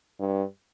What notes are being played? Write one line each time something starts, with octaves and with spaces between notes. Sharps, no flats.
G2